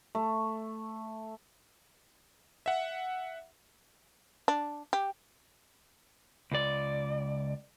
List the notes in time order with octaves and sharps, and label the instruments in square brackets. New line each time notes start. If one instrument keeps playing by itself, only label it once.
[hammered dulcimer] A3
[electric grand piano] E5 F#5
[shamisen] D4
G4
[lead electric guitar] C#2 D5